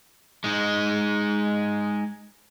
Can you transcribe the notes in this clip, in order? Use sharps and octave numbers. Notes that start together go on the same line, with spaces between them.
G#3 D#4